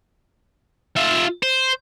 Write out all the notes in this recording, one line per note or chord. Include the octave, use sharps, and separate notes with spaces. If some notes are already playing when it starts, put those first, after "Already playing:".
F4 E5
C5